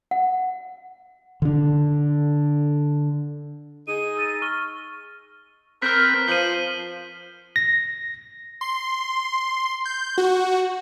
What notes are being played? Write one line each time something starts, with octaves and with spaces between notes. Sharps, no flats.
F#5
D3 D4
D#4 G#4 D#7
E6 A6 A#6
C#6 F6 G7
C4 A#4 B4 F6 B6
F3 C5 D#7 F#7 G7
A#6
C6
G6
F#4